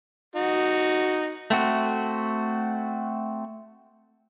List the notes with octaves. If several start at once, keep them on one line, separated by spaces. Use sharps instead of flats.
D#4 F#4
A3 C4 F#4